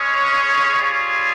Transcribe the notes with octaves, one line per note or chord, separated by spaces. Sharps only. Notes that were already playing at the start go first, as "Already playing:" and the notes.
Already playing: G#3 C#4 G#4 C#5
G3 C4 F4 G#4 C#5